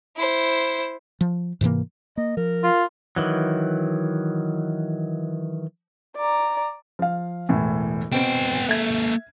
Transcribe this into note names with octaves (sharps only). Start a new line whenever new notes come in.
E4 C5
F3
G#2 C3 E3 A#3
A#3 D#5
F3 A#4
F4
D#3 E3 F#3
D5 A#5
F3 F5
E1 A2 E3
B2 B3 C4 G5 D7
A#3 A4 E5 G#6